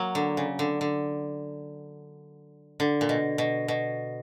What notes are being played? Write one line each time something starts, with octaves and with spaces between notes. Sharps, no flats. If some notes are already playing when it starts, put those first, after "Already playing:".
Already playing: F#3 A#3
D3
C#3
D3
D3
D3
A#2
B2
B2
B2